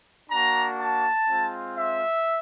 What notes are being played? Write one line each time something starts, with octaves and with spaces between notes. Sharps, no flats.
A#3 D4 F#4 A#5
A5
G#3 C4 F4
E5